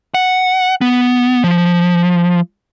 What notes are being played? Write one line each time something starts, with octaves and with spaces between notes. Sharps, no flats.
F#5
B3
F3